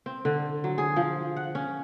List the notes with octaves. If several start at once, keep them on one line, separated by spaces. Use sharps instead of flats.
C4
D3
F#3
G#4
F3
F#5
C#4